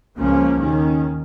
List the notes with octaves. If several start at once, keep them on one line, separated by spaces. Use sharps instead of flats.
C#2 C#3 F3 A#3 C#4
D#2 D#3 C#4